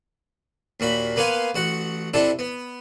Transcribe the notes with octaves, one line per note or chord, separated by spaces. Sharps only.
D#2 A#2 F#4 B5
A#3 B3 B4 F5 G#5 C6
A1 F#4 F#5
C3 D4 E4 A4
B3